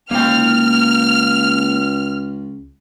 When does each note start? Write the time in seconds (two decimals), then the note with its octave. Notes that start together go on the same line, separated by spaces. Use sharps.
0.11 C#2 A#3 G5 F6